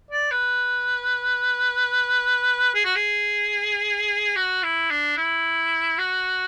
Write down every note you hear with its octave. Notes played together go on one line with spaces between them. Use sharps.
D5
B4
G#4
F#4
G#4
F#4
E4
D4
E4
F#4